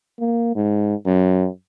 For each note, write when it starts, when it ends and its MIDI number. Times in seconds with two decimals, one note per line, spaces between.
0.20 0.55 58
0.55 0.95 44
1.06 1.47 42